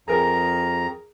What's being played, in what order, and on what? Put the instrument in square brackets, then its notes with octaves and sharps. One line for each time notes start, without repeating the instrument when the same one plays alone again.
[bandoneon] F2 A#5 [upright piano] G#4 A#4